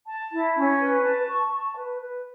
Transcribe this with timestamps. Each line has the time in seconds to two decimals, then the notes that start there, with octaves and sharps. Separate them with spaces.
0.08 A5
0.31 E4
0.56 C#4
0.80 B4
1.03 A5
1.28 C#6
1.51 A5
1.75 B4
1.99 B4